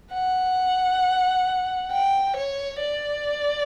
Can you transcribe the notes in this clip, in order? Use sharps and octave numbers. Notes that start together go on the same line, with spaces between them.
F#5
G5
C#5
D5